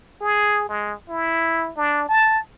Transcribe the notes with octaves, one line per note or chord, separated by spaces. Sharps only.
G#4
G#3
E4
D4
A5